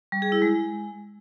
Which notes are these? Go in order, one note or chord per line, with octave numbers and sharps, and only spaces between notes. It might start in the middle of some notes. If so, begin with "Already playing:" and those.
G3
G#4
E4
G#3